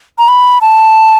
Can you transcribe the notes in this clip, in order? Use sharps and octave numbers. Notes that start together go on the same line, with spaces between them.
A#5
B5
A5